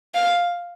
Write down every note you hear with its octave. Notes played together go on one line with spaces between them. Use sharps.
F5